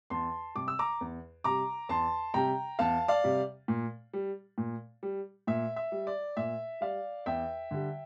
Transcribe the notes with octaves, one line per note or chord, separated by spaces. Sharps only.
E2 A5 C6
C3 G3 D6
E6
A#5 D6
E2
C3 G3 A#5 D6
E2 A5 C6
C3 G3 G5 A#5
E2 F5 A5
D5 F5
C3 G3
A#2
G3
A#2
G3
A#2 E5
E5
G3
D5
A#2 E5
G3 D5 F5
E2 E5 G5
D3 G3